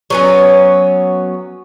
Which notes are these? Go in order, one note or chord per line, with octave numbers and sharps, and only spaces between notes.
F#3 B3 C#4